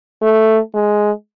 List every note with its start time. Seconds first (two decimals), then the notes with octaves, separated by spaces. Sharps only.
0.22 A3
0.74 G#3